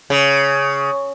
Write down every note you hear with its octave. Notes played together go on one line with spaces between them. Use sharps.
C#3